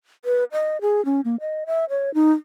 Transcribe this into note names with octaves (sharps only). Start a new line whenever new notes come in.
B4
D#5
G#4
C#4
A#3
D#5
E5
C#5
D#4